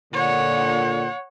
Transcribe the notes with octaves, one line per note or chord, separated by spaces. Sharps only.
A#2 D3 C#5 F#5